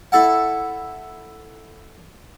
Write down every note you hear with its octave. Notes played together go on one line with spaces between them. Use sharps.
E4 A4 F#5